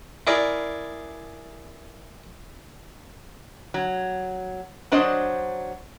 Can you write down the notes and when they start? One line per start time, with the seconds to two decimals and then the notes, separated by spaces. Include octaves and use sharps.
0.27 E4 G#4 A#4 D5
3.74 F#3
4.92 F#3 D4 C5 D#5